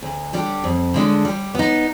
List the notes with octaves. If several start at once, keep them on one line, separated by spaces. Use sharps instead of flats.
D2
D3 G3 D4 G4
F2
D3 G#3 D4
G3
B3 D#4